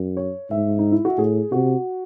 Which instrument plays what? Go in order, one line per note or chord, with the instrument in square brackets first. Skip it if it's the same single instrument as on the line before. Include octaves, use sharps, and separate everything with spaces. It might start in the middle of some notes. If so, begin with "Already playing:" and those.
Already playing: [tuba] F#2
[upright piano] C#5
[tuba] G#2 [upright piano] E5
[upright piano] D#4
E4
F#4
[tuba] A2 [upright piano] G#4
[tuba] C3 [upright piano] F#4